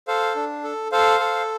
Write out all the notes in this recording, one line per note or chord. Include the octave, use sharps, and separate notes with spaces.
A4 C5 F5
D4
A4
A4 C5 F5
A4